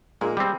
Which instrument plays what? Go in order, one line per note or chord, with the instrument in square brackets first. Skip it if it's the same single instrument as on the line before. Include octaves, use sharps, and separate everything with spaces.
[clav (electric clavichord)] A#2 [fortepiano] G#3 A#3
[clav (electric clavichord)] G3 C4